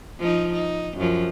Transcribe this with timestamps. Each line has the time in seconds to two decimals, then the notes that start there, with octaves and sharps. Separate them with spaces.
0.20 F3 D#4
0.53 D#4
0.97 F#2 F3